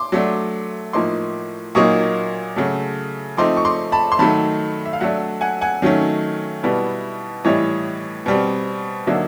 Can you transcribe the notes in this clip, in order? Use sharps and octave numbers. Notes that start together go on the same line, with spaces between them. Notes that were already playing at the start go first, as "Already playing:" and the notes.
Already playing: C6 D6
F#3 A3 D4
A2 F3 A#3 D#4 C6 D6
A#2 F#3 A#3 D#4 C#6 D#6
C#3 F#3 A3
F3 A3 C4 D#4 C6 D6
C#6
C6 D6
A5 B5
C6
D#3 F#3 A3 A5 B5
E5
F5
F#3 A3 D4 E5 F#5
F#5 G#5
F#5 G#5
D#3 F#3 A3 C#4
B2 G3 B3 E4
A2 E3 G3 C#5 D#5
B2 G3 C4
D3 F#3 A#3 D#4 D5 E5